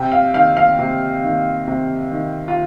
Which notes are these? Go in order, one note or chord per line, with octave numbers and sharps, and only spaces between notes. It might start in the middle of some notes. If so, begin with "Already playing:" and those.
Already playing: C3 G5
F5
D#3 F5
F5
C3
D#3
C3
D#3
F4